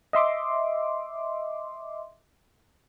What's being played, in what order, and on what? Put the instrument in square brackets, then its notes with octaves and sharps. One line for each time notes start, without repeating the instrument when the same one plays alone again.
[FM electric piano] D#5 E5 C6 D6